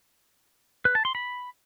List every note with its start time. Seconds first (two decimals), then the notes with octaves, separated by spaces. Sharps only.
0.85 B4
0.95 A5
1.05 C6
1.15 B5